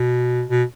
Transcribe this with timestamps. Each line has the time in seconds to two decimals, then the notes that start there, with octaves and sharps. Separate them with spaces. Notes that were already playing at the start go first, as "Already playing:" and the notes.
Already playing: B2
0.49 B2